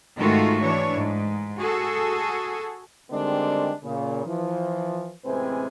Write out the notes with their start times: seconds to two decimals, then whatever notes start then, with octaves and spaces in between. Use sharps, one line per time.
0.18 G#2 D#3 A3 F4 F#4 A4
0.61 E3 D4 C#5
0.96 G#2
1.57 F#4 G#4 A4
3.10 D3 D#3 G3 G#3 C4 D4
3.83 A#2 C#3
4.26 E3 F3
5.25 A1 C3 G#3 C4 B4 G#5